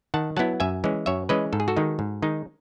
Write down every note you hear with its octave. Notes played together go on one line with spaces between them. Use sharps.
D#3 F#5 A5
F#3 B3 E4 F#5 A5
F#2 E5 G#5
E3 G#3 C#4
F#2 C#5 E5
E3 G#3 C#4 B4 D#5
G#2 A4
G#4
F#4 A4
D#3 G#3 D#4
G#2
D#3 G#3 D#4